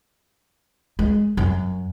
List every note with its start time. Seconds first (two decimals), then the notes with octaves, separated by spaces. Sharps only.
0.99 G#3
1.37 F#2